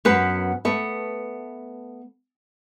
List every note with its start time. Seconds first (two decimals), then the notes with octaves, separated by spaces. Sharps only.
0.05 F#2 B3 B4
0.65 A3 B3